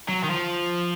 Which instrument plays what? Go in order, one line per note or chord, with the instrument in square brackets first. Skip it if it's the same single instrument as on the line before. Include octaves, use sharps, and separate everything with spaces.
[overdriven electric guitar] F#3
D#3
F3